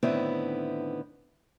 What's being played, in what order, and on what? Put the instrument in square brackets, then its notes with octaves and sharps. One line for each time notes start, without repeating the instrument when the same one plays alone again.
[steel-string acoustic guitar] A2 D3 D#3 B3 C4 E4